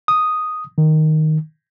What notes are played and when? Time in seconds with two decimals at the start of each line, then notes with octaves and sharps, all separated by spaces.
0.08 D#6
0.78 D#3